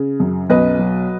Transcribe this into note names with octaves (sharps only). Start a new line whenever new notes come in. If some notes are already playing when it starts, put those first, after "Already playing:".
Already playing: C#3
F#2
B1 B4 D#5
F#3